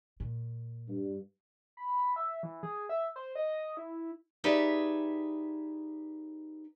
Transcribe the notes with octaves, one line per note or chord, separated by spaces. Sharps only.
A#2
G2
B5
E5
E3
G#4
E5
C5
D#5
E4
D#4 G4 G#4 B4 D5 E5